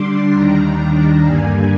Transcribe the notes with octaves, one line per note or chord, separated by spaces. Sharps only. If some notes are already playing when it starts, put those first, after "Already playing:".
Already playing: D3 G3 D4 C6 D6
D#2 D#3 G3 D4 A#5
G2 D3 G3 A#3 G#5